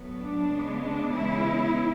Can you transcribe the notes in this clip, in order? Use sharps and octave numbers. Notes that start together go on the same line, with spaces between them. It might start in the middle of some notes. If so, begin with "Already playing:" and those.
Already playing: A2 F#3 B3
D4
C#3 G#3 B3
D4
C#3 E3 G#3 B3 E4